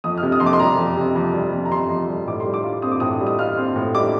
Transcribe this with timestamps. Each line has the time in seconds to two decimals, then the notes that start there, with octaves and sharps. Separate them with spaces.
0.04 F2 D#6
0.17 F6
0.23 C3
0.32 D#6
0.40 F2 C6
0.46 D6
0.53 C6
0.59 G3 A#5
0.78 F2
0.97 C3
1.16 F2
1.34 G3
1.52 F2
1.65 A#5
1.71 C3 C6
1.90 F2
2.08 G3
2.28 A2 D6
2.40 C6
2.46 G3
2.54 D6
2.64 F4
2.82 C4 D#6
2.92 D6
3.00 A2 D#6
3.21 G3
3.27 D#6
3.39 F4 F6
3.57 C4
3.76 A2
3.95 G3 D6